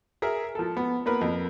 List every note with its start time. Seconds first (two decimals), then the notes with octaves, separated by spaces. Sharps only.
0.22 G#4 A#4 E5
0.55 F3 A4
0.77 B3
1.06 A#3 B3 A#4 B4
1.21 F2